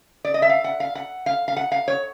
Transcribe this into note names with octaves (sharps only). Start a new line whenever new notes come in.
D5
D#5
E5
F5
F#5
F5
F#5
F5
F5
F#5
F5
C#5